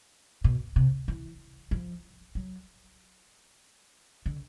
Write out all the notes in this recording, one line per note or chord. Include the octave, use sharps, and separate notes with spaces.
B2
C3
E3
F3
F#3
D3